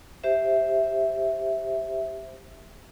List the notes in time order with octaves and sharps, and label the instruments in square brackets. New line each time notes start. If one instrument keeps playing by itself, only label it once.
[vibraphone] G4 C5 E5